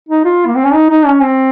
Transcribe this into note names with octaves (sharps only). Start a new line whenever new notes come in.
D#4
F4
A#3
C4
C#4
D#4
D#4
C#4
C4